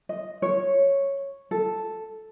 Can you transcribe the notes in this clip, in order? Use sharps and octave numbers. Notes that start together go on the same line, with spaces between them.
D#5
C#5
A4